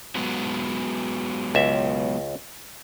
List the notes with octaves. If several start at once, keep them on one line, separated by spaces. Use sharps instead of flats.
F#3 G#3 B3
C#2 E5